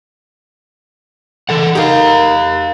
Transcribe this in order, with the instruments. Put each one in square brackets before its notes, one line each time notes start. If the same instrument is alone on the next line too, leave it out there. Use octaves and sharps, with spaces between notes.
[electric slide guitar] E3 A4 F#5
[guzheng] D#4 G#4 A#4 [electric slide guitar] G4 F5